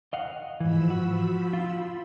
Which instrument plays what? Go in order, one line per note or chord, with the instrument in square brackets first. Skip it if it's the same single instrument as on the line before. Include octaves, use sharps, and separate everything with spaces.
[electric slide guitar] D#5 F5 F#5
[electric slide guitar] G#2 E3 [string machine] F3 B5 E6
[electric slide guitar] F#4
F4